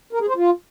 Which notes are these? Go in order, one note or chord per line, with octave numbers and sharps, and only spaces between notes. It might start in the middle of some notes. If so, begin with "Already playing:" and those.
A#4
G#4
C5
F4